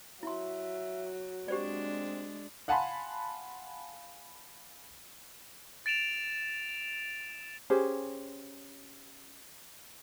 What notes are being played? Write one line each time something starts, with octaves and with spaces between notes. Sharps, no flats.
F#3 E4 E5 C6
G#3 C4 D4 G4 C5 D5
F5 F#5 G#5 A5 B5 C6
A6 D7 E7 F7
C#4 G4 G#4 C5